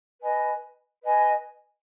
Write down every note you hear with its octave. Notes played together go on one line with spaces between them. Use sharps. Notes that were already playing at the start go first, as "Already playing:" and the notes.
B4 D#5 G#5
B4 D#5 G#5